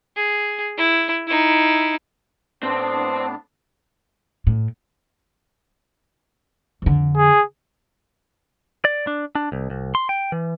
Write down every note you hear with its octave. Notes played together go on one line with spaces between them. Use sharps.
G#4
E4
D#4 E4
A2 B3 C4 D4 C5
A2
F2 D3
G#4
D5
D4
D4
C2
C2
C6
G5
E3